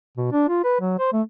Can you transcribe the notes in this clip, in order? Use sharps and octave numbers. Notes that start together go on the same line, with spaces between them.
B2
D4
F4
B4
F#3
C5
A3